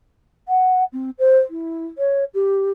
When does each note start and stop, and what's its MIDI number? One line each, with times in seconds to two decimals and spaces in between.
0.48 0.84 78
0.93 1.10 60
1.19 1.39 72
1.50 1.87 64
1.98 2.24 73
2.34 2.71 67